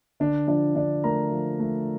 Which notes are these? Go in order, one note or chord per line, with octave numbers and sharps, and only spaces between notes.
D3 D4 D5
F3 D4 D5
D3 D4 D5
A3 A#4 A#5
F3
A3